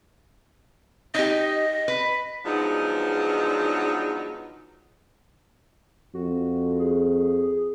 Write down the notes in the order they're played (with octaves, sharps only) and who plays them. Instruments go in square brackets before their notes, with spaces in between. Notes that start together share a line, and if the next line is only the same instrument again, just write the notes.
[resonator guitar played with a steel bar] D#4 G4 [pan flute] D#5
[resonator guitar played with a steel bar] B4
[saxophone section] F3 F#3 G#3 B3 D4 D#4
[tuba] F2 [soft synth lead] F#4
[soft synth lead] G#4